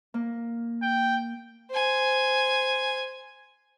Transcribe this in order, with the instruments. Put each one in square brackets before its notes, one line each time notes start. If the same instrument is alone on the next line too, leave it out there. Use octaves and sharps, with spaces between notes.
[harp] A#3
[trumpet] G5
[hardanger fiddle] C5 G#5